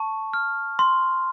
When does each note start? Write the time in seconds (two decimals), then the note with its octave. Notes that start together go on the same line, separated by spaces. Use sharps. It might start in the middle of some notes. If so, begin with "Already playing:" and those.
Already playing: A5 C#6
0.34 F6
0.79 C6